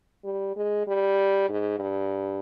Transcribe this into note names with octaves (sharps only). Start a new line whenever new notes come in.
G3
G#3
G3
G#2
G2